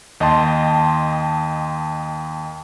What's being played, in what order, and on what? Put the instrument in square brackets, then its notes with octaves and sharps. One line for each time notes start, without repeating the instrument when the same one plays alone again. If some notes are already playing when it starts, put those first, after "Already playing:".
[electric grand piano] D#2 D#5 G5 A5 C6